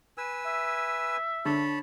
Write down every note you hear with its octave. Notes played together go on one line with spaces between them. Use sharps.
B4 G#5 E6
E5
D3 C#5 A5 B5